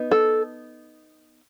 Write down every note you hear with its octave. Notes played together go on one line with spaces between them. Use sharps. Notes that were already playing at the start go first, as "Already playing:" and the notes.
Already playing: B3 D#4
A4